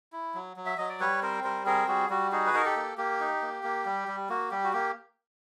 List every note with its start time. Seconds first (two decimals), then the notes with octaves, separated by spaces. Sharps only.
0.12 E4
0.35 F#3
0.57 F#3
0.66 E5
0.78 F#3 D#5
0.89 D5
1.00 G3 B4 C#5
1.22 C4 A#4 C5
1.44 G3 A#4 C5
1.66 C4 G#4 A#4
1.88 G3 F#4 G#4
2.10 G3 F#4
2.31 D#4 F#4 G#4
2.47 B4
2.54 D#4 A#4
2.65 G4 A4
2.76 A#3
2.98 A#3 G4
3.20 D#4
3.42 A#3
3.63 A#3
3.86 G3
4.08 G3
4.29 A#3 F#4
4.51 G3 G4
4.64 F#4
4.73 A#3 G4